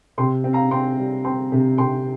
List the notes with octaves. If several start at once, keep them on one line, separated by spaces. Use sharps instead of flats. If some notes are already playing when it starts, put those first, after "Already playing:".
C3 G5 C6
C4
F5 A#5
C4 G5 C6
G3
C4 G5 C6
C3
C3 G5 C6